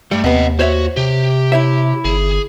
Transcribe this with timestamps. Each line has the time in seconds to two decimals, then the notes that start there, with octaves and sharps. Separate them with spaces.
0.11 G2 G3 A3
0.24 D#2 C3 B3 D#5 F#5
0.59 F#4 C5 C#5 E5
0.97 C3 G4
1.52 E4 C#5 E5
2.05 G1 G#4